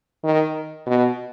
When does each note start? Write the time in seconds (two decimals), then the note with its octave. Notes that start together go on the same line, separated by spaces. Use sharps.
0.24 D#3
0.86 B2